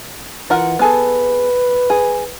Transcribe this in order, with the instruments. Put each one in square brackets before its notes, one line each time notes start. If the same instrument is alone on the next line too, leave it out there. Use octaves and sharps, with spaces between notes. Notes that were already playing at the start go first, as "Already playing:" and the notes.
[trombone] E3 [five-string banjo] F4 A#4 F#5
[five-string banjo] B3 G#4 A4 [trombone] B4
[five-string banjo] G#4